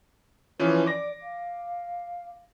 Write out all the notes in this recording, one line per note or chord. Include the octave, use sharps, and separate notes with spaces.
E3 F3 C#4 B4
D5 D6 A#6
F5